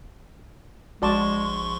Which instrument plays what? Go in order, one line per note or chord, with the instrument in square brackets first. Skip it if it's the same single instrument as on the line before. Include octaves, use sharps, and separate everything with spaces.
[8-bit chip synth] A#1 C6 C#6 [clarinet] G#3 [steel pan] F#4 D5 A5